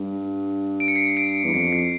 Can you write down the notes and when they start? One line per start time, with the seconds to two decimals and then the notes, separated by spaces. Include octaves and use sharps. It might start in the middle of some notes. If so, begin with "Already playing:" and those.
Already playing: G2
0.80 D7
0.88 C#7
0.96 C7 D7
1.17 C7 D7
1.44 E2
1.54 F2 C7
1.73 C7